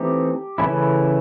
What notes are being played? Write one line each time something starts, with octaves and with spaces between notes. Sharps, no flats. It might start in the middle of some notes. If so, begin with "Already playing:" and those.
Already playing: E3 A3 C4 D#4 G4
C#3 E3 A3 C#4 E4